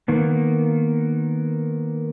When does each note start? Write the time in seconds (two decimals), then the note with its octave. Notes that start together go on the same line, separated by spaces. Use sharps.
0.08 D#3 A#3 B3